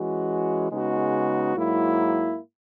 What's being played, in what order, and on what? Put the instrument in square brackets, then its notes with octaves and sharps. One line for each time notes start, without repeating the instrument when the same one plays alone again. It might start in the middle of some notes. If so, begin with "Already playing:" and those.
Already playing: [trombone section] E3 G#3 C#4 F#4
C#3 G#3 B3 D#4 F#4
G#2 F#3 A#3 E4